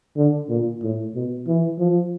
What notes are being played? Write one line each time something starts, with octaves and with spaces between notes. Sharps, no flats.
D3
A#2
A2
B2
E3
F3